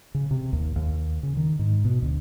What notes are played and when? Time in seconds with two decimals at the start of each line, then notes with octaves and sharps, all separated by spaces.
0.14 C#3
0.31 C3
0.53 D#2
0.76 D#2
1.23 C#3
1.37 D#3
1.59 G#2
1.85 B2
2.02 D2